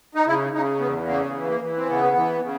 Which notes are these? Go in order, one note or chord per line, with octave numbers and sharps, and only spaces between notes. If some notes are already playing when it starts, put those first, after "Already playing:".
D#4
C#3 E4
C#3 D#4
E2 B3
C#3 A#3
E3
A#3
E3
C4
C#3 B3
E3
C#3